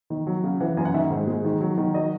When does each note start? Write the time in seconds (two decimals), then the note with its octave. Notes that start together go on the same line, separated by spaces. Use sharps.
0.10 D#3
0.27 F#3
0.44 C#3
0.61 E3 F#5
0.77 F#2 G#5
0.85 F#5
0.94 D#3 E5
1.10 G#2
1.27 G#3
1.45 D#3
1.61 F#3
1.78 D#3
1.94 F#3 D#5